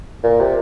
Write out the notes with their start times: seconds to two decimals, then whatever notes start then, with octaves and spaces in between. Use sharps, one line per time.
0.23 A#2
0.40 C3